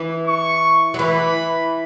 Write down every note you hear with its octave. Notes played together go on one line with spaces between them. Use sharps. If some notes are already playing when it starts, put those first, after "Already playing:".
Already playing: E3
C#6
F#3
E3 B5